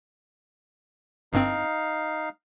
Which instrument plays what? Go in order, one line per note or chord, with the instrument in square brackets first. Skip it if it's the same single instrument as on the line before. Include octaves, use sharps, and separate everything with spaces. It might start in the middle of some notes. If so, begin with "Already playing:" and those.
[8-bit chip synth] G1 G2 C4 [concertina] D#4 F5